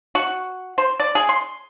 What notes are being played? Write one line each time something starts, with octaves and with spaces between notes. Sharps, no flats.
F#4
C5
D5
G#4
C6